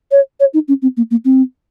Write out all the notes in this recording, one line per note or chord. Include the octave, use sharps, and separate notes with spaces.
C#5
C#5
D#4
C#4
C4
A#3
A#3
C4